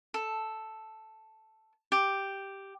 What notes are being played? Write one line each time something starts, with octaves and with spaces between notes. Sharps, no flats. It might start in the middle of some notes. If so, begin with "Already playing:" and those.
A4
G4